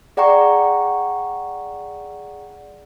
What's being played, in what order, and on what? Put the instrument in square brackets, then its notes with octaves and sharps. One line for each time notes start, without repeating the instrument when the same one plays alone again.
[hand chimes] G#4 D5 F#5 G5 A#5 C#6